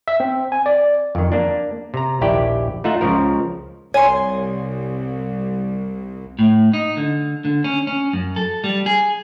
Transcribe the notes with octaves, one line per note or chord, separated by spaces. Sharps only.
E5
C4
G#5
D5
F2 D#3
A#3 D4
C3 A#5
A#1 D#2 E4 G4 D5 G5
A3 D#4 F4 E5 F#5
C#2 C#3 F3 A#4
C2 C#5 G#5 C6
A2
D#4
D3
D3
C#4
C#4
F#2
A4
G3
G#4